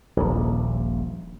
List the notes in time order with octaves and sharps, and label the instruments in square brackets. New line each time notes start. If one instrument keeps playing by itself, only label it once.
[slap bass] D#1 A#1